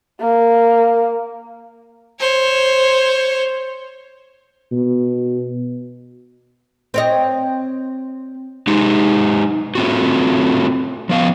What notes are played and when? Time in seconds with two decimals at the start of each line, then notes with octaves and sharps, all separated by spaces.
0.20 A#3
2.20 C5 C#5
4.72 B2
6.94 C4 C#5 D#5
8.67 G#3 D#4 G4
9.75 A3 C4 F4 F#4
11.09 F3 B3 F5